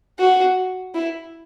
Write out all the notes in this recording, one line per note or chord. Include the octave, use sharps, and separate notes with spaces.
F#4
E4